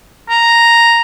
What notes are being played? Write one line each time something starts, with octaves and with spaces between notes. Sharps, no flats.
A#5